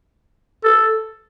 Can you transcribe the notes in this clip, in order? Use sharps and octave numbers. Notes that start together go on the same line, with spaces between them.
A4